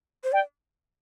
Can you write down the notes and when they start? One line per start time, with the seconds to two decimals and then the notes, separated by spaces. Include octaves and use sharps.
0.24 C5
0.32 D5 G5